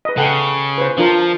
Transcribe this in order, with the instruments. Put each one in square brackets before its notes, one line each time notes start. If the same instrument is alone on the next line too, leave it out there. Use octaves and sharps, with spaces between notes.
[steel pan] B4 D#5
[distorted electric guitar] C#3 [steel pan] A4 F#5 G5
[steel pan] B4 C5
[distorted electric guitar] F3 [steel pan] D4 F4 A#4